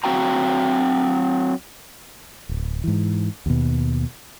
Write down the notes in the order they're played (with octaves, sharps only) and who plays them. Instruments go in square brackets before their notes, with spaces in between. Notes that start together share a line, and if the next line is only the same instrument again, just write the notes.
[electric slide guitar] F#3 C4 F#4 F5 G5 A#5
[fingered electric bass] D1
G#2 E3
D#2 B2